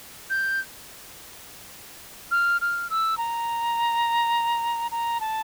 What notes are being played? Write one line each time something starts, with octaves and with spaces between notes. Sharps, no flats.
G6
F6
F6
E6
A#5
A#5
A5